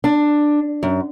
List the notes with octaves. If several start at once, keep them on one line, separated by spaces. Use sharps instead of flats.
D4
F#2